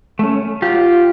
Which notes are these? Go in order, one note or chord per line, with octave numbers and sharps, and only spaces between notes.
A3 C#4
F#3 F4 G4